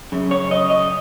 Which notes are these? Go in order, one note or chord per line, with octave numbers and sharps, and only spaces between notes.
F#2 C#3
C#5
D#5
D#5